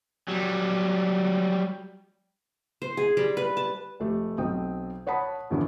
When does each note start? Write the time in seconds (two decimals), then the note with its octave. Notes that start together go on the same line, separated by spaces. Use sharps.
0.28 F#3 G3
2.82 C5
2.97 G#4
3.17 G3
3.37 B4
3.57 A5
4.00 F1 A3 G4
4.38 B1 C4 G5 D#6
5.07 C#5 F#5 A5 B5 D#6
5.50 A#1 E2 C#4 E4